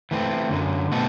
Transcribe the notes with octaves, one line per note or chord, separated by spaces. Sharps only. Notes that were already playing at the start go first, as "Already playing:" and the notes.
E3 A3 C4
F#2 D3 F#3
B2 A3 C4 F#4 A4